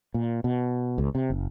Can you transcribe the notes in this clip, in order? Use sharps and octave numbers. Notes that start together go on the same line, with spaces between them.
A#2
B2
C#2
C3
F#1